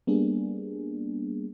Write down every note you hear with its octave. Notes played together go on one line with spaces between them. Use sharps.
G3 A#3 B3 D4 G#4